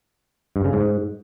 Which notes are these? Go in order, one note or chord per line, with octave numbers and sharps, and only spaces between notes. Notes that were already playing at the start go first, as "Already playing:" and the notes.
G2
C#3
G#2